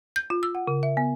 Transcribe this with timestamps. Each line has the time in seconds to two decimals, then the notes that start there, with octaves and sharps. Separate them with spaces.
0.16 G6
0.30 F4
0.43 E6
0.55 F#5
0.68 C#3
0.83 E5
0.97 B3